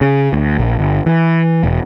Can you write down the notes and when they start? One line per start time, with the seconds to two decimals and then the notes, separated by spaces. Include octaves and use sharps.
0.01 C#3
0.33 D2
0.58 A#1
0.79 G1
1.06 E3
1.64 E1